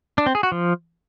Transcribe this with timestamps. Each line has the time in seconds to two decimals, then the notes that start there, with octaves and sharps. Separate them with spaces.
0.18 D4
0.26 C4
0.35 G#4
0.43 F#4
0.52 F3